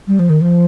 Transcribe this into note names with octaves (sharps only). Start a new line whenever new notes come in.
G3
F3
D#3
F3